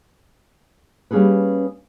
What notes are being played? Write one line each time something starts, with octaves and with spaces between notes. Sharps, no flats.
G3 A#3 C#4 G#4 A4 B4